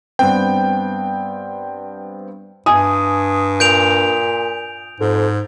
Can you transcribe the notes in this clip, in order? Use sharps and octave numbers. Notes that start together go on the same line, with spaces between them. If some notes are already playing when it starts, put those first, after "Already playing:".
G2 B3 C4 G5
G2 G#5 D#6
A#2 G6 D7 F7
F2 G#2